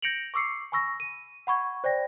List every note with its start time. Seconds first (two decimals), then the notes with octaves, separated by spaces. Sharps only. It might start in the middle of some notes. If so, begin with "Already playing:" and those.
0.02 G6 A#6 C#7 D7 F7 F#7
0.34 C#6 D6 E6 C7 C#7
0.72 G#5 B5 C#6 E6 A#6
1.00 D#7
1.47 F#5 B5 C#6 G#6
1.84 C5 D5 G5 A#6